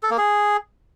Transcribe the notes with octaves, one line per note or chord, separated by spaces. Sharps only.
A4
A#3
G#4